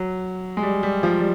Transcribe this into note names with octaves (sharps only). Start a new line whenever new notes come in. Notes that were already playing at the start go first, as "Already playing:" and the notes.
Already playing: F#3
G#3
G3
G3
F3
G3